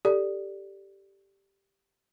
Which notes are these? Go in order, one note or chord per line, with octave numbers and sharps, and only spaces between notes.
G4 A4 D5